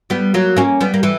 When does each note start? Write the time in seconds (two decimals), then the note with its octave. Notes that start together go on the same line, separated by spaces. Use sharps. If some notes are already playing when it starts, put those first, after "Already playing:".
0.10 G3 B3
0.34 F#3 A#3
0.57 A#3 C#4
0.81 G3 B3
0.94 A#3
1.03 E3 G3